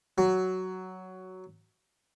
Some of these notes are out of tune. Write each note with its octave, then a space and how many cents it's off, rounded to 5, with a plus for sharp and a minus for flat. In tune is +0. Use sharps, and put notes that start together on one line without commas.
F#3 +10